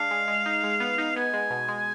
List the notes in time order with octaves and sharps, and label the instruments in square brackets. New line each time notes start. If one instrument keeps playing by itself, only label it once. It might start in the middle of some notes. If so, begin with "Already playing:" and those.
Already playing: [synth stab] G#3 D4 [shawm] F5
[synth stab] G#3
G#3
D#4
G#3
B3
D#4
[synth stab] B3 [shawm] G#5
[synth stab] G#3
B2
G#3